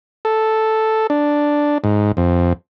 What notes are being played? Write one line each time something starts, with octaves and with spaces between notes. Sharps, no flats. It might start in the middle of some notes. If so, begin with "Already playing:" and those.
A4
D4
G#2
F2